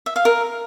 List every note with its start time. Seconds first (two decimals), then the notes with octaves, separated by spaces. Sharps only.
0.06 E5
0.16 F5
0.25 A#4